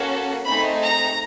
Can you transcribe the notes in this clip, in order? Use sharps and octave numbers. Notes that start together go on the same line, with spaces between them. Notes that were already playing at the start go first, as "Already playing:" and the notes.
Already playing: A#3 C#4 F#4 A4
A3 C4 D#4 G#4 B5
A#5